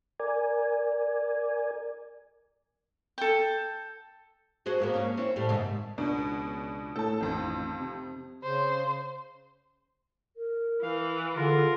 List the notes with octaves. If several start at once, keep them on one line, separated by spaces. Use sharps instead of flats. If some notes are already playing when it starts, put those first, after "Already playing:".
A#4 D5 G#5
A4 G5
F#4 G#4 C5
G#2 A#3 B3
A#3 C#4
C4 C#4 E4
A2 G3
D#2 G#2 C3
C#2 B2 D4
A2 A4 A5
A1 F2 D#3
C3
C#3 C5
A#4
E3 F5
D3 F4 G#4 A#4